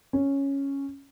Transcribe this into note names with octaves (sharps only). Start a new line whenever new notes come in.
C#4